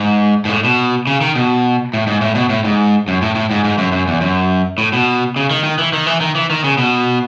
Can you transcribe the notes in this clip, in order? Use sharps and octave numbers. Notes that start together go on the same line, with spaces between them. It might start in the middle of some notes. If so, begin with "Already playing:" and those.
Already playing: G#2
G#2
A2
B2
C#3
D#3
B2
A2
G#2
A2
B2
A2
G#2
F#2
A2
A2
G#2
G#2
F#2
F#2
E2
F#2
A2
B2
C#3
D#3
D#3
E3
D#3
E3
D#3
E3
D#3
C#3
B2